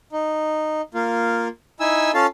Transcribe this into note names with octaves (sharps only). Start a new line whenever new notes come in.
D#4
A#3 F4
D#4 E4 G#5 E6
C#4 F4 A4 F5 A5